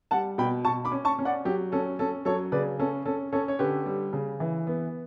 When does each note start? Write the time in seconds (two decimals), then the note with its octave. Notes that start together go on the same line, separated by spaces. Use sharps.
0.11 G3 F#5 A5
0.38 B2 G5 B5
0.65 B2 A5 C#6
0.85 B5 D6
0.92 C#4
1.05 A5 C#6
1.19 C#4
1.25 D5 F#5
1.45 F#3 G4
1.72 C#4 A4
1.99 C#4 A4
2.25 F#3 A4 C#5
2.52 C#3 B4 D5
2.79 C#4 A4
3.06 C#4 A4
3.32 C#4 A4 C#5
3.48 C#5
3.59 D3 G4 B4
3.86 G3
4.13 C#3
4.40 E3
4.67 B3